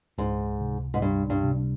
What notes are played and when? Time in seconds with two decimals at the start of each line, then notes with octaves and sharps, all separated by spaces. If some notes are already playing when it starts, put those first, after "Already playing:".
0.18 C#2 G#2
0.61 C3
0.94 G#2
1.02 G2 G3
1.30 G2
1.44 C3